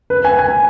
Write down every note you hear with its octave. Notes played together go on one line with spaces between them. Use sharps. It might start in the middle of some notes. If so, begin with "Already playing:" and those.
B4
G#5
G#5